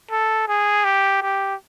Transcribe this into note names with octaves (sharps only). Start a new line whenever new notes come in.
A4
G#4
G4
G4